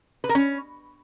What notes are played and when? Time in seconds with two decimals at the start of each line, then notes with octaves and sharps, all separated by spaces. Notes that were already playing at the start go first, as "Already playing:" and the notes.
0.24 B4
0.29 A#4
0.35 C#4